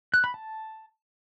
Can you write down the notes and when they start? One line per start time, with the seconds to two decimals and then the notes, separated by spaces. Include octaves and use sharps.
0.14 F#6
0.24 B5
0.34 A5